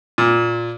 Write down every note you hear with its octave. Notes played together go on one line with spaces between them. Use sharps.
A#2